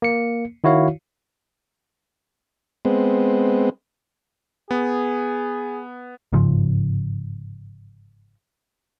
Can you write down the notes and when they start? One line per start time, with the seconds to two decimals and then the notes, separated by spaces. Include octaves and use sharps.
0.02 A#3 C#7
0.64 D#3 E4 F#4 C#5 F5
2.85 G#3 B3 C4
4.71 B3 G#4
6.32 G1 G#2 C#3 F3